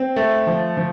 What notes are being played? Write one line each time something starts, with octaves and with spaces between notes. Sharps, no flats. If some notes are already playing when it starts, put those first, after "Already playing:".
Already playing: C4
A3
F3
F3